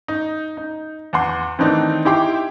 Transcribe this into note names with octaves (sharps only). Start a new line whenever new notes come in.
D#4
D#4
E2 F#5 C6
D#3 E3 A3 C4 D4 D#4
D#4 E4 G4 G5 C6 D6